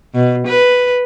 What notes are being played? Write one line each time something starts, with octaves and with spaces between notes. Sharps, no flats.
B2
B4